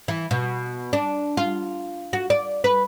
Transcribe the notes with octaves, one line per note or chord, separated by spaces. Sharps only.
E3
B2
D4
F4
F#4
D5
B4